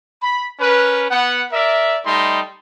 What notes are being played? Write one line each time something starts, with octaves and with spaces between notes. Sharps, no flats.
B5
C#4 A#4 B4
B3 F#5
A#4 D5 E5
G3 A3 D#4 D#5 C6